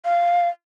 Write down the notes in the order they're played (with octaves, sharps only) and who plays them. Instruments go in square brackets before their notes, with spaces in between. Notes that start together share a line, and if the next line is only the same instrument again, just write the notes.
[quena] F5